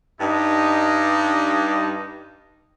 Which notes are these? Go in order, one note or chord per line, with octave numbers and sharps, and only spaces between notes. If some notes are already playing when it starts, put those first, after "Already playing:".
G2 D#4